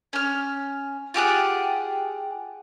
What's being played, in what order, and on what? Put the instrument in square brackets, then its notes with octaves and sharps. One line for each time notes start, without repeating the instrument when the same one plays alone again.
[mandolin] C#4 F6
F4 G4 G#4 F#5